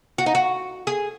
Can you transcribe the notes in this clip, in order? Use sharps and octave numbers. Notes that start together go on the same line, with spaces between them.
F#4
D#4
F#4
G#4